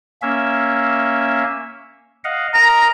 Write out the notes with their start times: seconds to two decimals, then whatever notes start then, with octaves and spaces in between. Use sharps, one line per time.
0.22 A#3 C#4 E5
2.24 D#5 F5 F#5
2.54 A#4 D#5 A#5